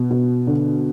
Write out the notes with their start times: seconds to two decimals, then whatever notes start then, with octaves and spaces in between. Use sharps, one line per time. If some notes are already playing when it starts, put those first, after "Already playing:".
Already playing: B2
0.10 B2
0.47 D3